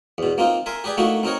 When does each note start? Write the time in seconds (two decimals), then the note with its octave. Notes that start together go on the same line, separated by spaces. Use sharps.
0.18 E2 B2
0.38 A#3 C4 D#4 F4
0.66 A#4 E5 G#5 C6
0.84 G4 G#4 B4 D5 G5
0.97 A3 A#3 D#4 E4 F#4
1.23 C4 D#4 A#4 C#5